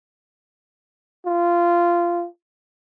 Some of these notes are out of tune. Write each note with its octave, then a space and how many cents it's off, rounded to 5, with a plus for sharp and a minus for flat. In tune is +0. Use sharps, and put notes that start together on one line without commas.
F4 -15